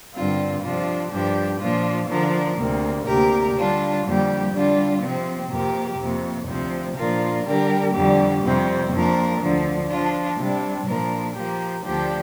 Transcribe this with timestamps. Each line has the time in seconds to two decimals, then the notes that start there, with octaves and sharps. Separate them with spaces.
0.14 G2 D3 G3 C4 F4
0.62 C3 F3 D4 F4
1.11 G2 F3 D4 G4
1.60 A#2 F3 D4 F4
2.08 D3 F3 D4 A#4
2.57 D2 C3 A#3
3.06 D2 C3 A#3 G4 A#4
3.55 D3 G3 D4 F4
4.04 F2 D3 G3 A#3 G4
4.52 D3 G3 D4 F4
5.02 C3 F3 C4
5.50 F2 C3 A#3 G4 A#4
5.99 F2 C3 A#3
6.47 D2 C3 F3 C4
6.96 A#2 F3 D4 F4 A#4
7.45 D3 G3 D4 G4 A#4
7.94 F2 D3 G3 D4 G4
8.42 F2 C3 G3 C4
8.92 F2 F3 A#3 D4 A#4
9.40 D2 D3 F3
9.89 F3 D4 F4
10.38 C3 G3 D4
10.87 A#2 F3 D4 A#4
11.36 F3 A#3 G4
11.84 D2 D3 F3 D4 G4